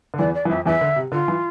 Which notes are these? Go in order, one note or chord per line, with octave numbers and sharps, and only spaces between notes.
D3
E2 E3 D5
D5
E3
F2 F3 E5
E2 E3 E5
D3
C3
D3 F4
E3